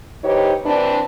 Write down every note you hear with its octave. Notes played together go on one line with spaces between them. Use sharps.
E3 D#4 G4 C5 C#5
E3 C4 D4